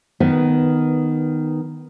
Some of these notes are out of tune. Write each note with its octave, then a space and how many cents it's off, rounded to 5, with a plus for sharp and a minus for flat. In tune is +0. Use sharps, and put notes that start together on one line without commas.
D#3 +0 B3 +10 B4 -5